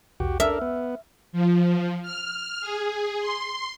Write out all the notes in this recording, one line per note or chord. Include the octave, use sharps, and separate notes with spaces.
B1 E2 F#4 G4
D4 A4 A#4 E5 F6
B3
F3
F6
G#4
C6